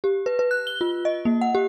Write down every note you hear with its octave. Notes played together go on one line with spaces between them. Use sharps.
G4
B4
B4
F#6
G7
F4
D#5
A#3
F#5
G4